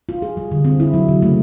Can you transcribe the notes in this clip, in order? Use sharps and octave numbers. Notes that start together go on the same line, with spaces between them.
F4
G#4
G3
D3
C4
E4
F#3
C#3
A3